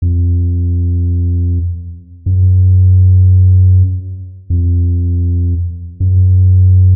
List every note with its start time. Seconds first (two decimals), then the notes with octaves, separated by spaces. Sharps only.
0.02 F2
2.26 F#2
4.50 F2
6.00 F#2